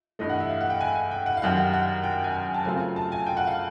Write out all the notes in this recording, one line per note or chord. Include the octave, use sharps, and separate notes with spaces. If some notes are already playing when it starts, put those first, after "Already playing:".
G2 E3 A3 D#5
F#5
E5
F5
F#5
G5
G#5
G#5
G5
F#5
F5
F#2 D#3 G3 F#5
F#5
F#5
G5
G#5
G#5
G#5
A5
C#3 F#3 A3 C4 F4 G#5
A5
G#5
G5
F#5
F5